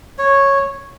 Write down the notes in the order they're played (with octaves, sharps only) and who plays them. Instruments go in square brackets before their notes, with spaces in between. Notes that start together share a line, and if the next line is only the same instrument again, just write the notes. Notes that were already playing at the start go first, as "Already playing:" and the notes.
[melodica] C#5